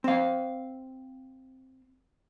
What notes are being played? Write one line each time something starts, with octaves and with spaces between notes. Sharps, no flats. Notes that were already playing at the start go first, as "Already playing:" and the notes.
C4 F5